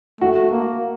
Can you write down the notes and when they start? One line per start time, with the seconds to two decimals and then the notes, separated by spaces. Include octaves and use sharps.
0.20 A3 F#4
0.51 A#3